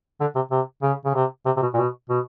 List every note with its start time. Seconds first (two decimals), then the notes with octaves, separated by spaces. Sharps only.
0.20 D3
0.35 C3
0.51 C3
0.82 C#3
1.05 C#3
1.15 C3
1.46 C3
1.57 C3
1.62 B2
1.74 A#2
1.77 B2
2.09 B2